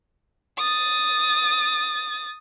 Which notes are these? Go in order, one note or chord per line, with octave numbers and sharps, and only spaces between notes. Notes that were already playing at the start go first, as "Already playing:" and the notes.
D#6 A6